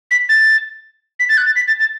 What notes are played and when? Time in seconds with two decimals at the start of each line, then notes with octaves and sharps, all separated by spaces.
0.11 B6
0.29 A6
1.20 B6
1.29 A6
1.37 F#6
1.46 A6
1.56 B6
1.68 A6
1.80 A6